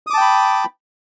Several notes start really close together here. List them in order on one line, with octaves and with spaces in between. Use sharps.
D#6 D6 A5 G5 B5